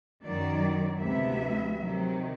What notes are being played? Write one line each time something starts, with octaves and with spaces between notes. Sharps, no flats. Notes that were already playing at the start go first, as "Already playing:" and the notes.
F#2 D#3 F#3 D5
D2 C3 F3 G#3 B3 E5
C3 D#3 F#3